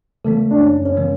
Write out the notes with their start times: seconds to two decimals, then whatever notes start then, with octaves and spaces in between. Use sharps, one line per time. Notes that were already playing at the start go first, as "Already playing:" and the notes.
0.25 C#3 E3 G#3 A3 B3
0.51 D4
0.61 F#2 C#4
0.85 C#4
0.97 C#3 E3 G#3 B3